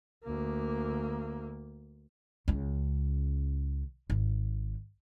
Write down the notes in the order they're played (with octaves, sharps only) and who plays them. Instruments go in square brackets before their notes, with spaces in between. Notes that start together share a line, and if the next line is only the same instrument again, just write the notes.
[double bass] D2 A#3
[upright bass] C#2 C#3
G#1